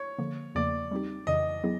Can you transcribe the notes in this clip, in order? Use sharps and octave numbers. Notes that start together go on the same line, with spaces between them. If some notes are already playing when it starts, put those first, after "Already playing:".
Already playing: C#5
D3 F3 A#3
E2 C#3 F3 A#3 D5
G3 C4 D#4 G4
F2 C#3 E3 D#5
F#3 B3 E4 G#4